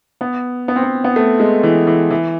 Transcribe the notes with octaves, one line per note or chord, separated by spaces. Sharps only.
B3
B3
C4
B3
B3
A3
G#3
E3
E3
E3